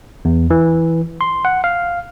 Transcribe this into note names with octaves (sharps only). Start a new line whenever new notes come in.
E2
E3
C6
F#5
F5